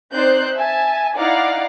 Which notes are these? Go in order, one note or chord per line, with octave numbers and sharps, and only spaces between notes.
C4 D#4 C5 D5 F#6 G6
E5 G#5 A5
D#4 E4 D5 F5 F#5 D6